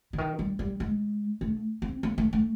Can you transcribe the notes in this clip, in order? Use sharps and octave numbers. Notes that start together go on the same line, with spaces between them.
D3
D#3
G3
G3
G#3
A3
C4
A#3
A3
A3